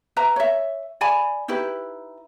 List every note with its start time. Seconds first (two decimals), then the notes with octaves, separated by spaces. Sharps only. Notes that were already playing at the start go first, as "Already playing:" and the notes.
0.17 B4 E5 A#5
0.36 C#5 E5
1.01 D5 G#5 B5
1.48 D#4 E4 G4 B4